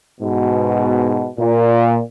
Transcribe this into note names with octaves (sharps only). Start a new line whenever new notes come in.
G#2 B2
A#2